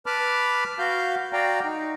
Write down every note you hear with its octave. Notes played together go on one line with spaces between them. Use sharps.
B4 A5 B5 D6 F6
F#4 F5 G6
F#4 D5 F5 G5 A#5
D#4